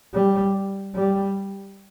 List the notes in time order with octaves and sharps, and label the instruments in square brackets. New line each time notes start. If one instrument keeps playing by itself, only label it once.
[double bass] G3
G3